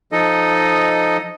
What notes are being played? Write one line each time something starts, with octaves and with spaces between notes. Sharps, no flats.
F3 D#4 A4 D#5